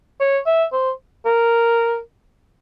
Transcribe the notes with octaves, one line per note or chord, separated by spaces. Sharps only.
C#5
E5
C5
A#4